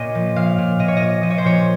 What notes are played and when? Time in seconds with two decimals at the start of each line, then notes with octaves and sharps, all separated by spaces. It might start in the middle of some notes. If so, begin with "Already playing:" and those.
Already playing: A#2 F4 C#5 D#5
0.15 F3
0.36 A#2 F5
0.58 A#2
0.79 A#2 D#5
0.88 C#5
0.97 A#2 D#5
1.23 F3 D#5
1.30 C#5
1.38 C5
1.45 A#2 C#5